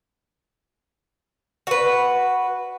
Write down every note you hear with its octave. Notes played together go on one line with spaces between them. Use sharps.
F#4 B4